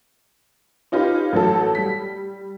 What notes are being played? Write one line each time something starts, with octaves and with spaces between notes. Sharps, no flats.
C#4 D#4 F4 G4 B4
A1 F#3 A4
G3 B6